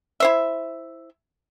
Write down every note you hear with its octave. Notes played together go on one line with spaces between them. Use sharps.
E4 C5 E5